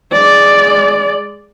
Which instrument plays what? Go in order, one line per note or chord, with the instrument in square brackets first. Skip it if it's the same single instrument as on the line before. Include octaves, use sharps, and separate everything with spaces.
[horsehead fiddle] G#3 D5